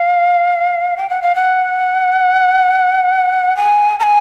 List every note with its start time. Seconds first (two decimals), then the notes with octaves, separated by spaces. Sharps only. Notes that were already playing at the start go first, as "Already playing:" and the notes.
Already playing: F5
0.97 G5
1.09 F#5
1.22 F5
1.35 F#5
3.56 G#5
4.00 A#5
4.03 G#5